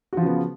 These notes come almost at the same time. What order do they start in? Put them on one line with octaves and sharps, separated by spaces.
F#4 F3 C#3 B3